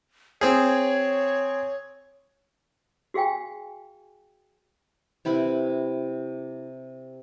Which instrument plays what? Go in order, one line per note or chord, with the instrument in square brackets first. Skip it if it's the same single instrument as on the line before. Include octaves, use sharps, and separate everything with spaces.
[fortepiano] C4 G#4 [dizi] C#5
[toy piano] F#4 G#4 F5 G5 G#5
[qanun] C3 E4 B4 B5